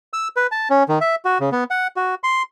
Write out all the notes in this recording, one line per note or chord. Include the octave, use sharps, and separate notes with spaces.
E6
B4
A5
C#4
D#3
E5
F#4
C#3
B3
F#5
F#4
C6